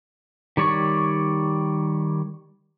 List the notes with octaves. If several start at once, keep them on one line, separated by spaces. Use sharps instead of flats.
D#3 G3 C#5 D5 C#6